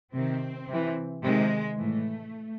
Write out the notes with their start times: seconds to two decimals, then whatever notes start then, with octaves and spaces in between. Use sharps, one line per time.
0.13 C3 D#3 C4
0.68 C3 E3
1.23 C3 D#3 G#3
1.77 A2 E3 A3